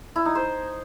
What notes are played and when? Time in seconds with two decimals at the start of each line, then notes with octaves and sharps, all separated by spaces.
0.16 E4
0.25 D#4
0.35 C5